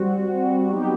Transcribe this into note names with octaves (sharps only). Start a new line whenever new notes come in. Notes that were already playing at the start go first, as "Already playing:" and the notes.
Already playing: G3 C4 F#4
F#3 B3 D#4 G4